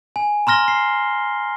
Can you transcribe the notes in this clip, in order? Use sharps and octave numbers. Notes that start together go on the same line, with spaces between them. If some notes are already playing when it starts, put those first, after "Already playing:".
G#5
A#5 C6 F6 A#6 G7
C7